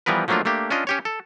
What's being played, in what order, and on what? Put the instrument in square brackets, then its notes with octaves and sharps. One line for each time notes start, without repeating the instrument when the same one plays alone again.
[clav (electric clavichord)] E3 F3 G3 B3 A#4 B4
F3 F#3 A3 A#3 D4 F4
A3 A#3 D4 G4
C#4 D4 F4 D#5
C#4 G4 C#5
A4